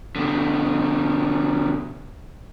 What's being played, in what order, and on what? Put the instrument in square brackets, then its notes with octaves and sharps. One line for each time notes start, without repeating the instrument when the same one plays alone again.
[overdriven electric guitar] B2 D3